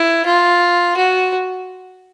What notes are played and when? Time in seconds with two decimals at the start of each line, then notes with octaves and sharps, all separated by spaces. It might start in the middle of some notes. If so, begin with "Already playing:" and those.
Already playing: E4
0.26 F4
0.97 F#4